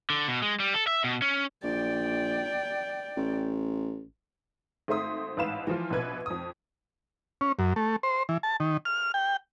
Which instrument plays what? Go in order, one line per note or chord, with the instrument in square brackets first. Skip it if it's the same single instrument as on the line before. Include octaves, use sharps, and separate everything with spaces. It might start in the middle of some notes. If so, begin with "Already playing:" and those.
[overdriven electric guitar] D3
B2
G#3
G3
A4
E5
B2
C#4
[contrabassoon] A#1 [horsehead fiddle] D5 G5
[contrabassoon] A1
[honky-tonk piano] G#1 A3 C4 E5 C6 D#6
A1 G#2 B4 F5 B5 E7
E3 F3 F4
A#1 B2 B4 G#6
F2 D#6
[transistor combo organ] C#4
F#2
A3
C5
E3
A5
D#3
F6
G5